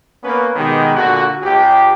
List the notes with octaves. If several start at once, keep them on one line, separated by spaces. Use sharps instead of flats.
A#3 B3 C#4 B4
B2 D#3 G#3 B3 G4
A#2 D3 F#4
C#2 G4